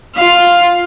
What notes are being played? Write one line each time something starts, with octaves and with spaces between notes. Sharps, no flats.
F4 F5